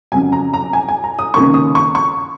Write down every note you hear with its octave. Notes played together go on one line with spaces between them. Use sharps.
F2 C#3 F#3 G#5
A#5
A#5
G#5
G#5
A#5
D#6
C#2 C3 D#3 A#3 C#4 C#6
D#6
C#6
C#6